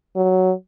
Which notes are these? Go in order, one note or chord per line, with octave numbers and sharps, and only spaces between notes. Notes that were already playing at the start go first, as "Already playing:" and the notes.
F#3